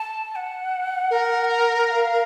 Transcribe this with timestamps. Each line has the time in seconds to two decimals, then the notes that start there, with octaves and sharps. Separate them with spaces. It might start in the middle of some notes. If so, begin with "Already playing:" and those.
Already playing: A5
0.31 A5
0.36 F#5
1.11 A#4
1.91 F5